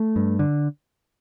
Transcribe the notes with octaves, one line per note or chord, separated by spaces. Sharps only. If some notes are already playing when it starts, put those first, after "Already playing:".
Already playing: A3
G2
D3